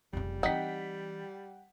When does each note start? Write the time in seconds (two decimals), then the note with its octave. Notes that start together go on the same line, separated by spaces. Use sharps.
0.13 F1 C#3 G3
0.43 E3 C4 D#4 F#5 G5 B6